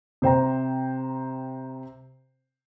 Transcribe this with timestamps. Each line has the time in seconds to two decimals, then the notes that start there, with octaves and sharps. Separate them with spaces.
0.22 C3 C5 G5 A#5